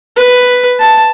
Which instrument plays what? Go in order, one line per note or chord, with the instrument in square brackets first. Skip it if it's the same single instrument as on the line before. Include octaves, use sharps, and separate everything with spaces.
[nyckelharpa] B4
A5